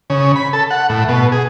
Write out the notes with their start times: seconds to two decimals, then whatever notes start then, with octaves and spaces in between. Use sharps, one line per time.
0.10 C#3
0.36 B5
0.53 A4
0.71 F#5
0.89 A2
1.09 B2
1.32 G#4